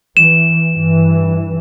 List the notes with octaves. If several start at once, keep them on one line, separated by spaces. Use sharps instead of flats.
E3 E7
G2 E3